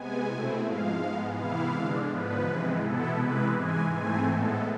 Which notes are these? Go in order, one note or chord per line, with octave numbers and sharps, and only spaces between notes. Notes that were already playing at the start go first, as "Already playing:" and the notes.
Already playing: C3 G#3 B3 G#5
B2 A3 C4 E4
G#2 F3 G#3 F5
G#2 G#3 B3
C3 E3 B3 E4 F5
D3 G#3 D4
G#2 F3 B3 B4
C3 E3 G#3
B2 B3 E4 A4
C3 E3 G#3 B4
G#2 E3 G#3 G#5
G#2 E3 A3 C4 G#5
A2 G#3 B3 A4